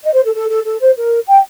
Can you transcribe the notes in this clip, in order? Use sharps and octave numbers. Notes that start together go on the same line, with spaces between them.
D#5
C5
A4
A4
A4
A4
C5
A#4
G5